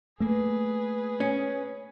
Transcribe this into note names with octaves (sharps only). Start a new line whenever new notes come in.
A3 A#3 G#4 B4
C#4